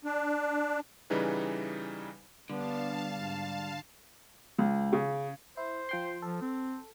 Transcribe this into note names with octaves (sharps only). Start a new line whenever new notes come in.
D4
C#3 E3 G3 D#4 G#4 B4
D3 G3 B3 D4 F5 A5
G#2
C#2
C#3
E4 C5
F3 G5 C6
F3 A4
C4